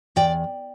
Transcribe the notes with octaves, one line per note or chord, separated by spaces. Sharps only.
E2 D5 G5